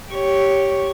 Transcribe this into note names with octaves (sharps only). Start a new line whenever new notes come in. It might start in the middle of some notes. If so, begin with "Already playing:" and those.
G4 C#5